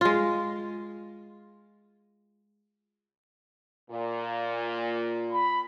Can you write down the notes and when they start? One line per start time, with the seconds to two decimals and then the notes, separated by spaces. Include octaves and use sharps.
0.01 G#3 F4
3.91 A#2
5.33 B5